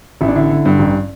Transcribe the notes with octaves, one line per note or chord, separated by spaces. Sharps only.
A1 E4
D4
D3 E4
D3
G2
A1